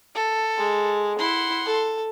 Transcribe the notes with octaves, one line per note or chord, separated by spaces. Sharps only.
A4
G#3
E4 F#5 C6
A4